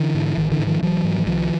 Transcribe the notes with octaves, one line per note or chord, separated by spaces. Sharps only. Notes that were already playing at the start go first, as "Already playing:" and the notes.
Already playing: D3 E3
G#2
A1 D#3
D3 E3
G#2
D#3 F3
A1 E3 F#3
G#2
E3
C2 D#3 F3